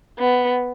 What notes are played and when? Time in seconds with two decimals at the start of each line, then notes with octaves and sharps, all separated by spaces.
0.19 B3